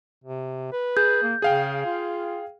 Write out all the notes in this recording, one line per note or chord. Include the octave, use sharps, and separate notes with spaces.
C3
B4
G#4 G6
A#3
C#3 G#4 F5 G5
F4